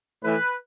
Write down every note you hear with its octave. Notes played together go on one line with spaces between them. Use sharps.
A2 E3 B4